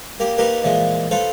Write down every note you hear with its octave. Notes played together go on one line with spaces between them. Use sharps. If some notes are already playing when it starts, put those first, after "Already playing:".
A#3 G4
A#3 D#4 G4 A#4 B4
A#2 E3 F3 G#3
F4 A4 B4 C5